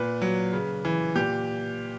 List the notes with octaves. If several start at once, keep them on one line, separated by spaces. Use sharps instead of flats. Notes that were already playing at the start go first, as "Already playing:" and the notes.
Already playing: A#2 B4
F#3
C#3
E3
A#2 G4